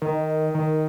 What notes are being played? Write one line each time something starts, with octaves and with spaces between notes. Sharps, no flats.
D#3
D#3